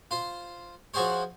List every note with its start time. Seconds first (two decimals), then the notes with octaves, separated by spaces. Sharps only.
0.11 F4 C5
0.94 F3 F#4 G#4 C5 C#5